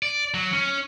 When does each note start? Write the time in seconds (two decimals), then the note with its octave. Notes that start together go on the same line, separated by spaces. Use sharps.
0.03 D5
0.34 F#3
0.53 C#4